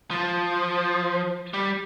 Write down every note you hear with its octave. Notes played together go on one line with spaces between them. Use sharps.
F3
G3